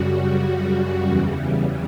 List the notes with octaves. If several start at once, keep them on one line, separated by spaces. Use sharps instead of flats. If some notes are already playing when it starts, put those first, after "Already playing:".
Already playing: F#2 C#3 G3 F#4
E2 C#3 E3 G3